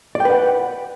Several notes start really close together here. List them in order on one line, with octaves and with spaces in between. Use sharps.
D5 G5 B4 F#5